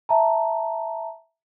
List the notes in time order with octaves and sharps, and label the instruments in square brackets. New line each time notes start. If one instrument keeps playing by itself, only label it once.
[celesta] E5 A5 A#5